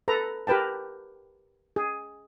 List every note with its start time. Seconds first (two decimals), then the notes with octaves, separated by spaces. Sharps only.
0.08 A4 B4 A#5
0.47 G4 A#4 B4 G5 A5
1.76 G#4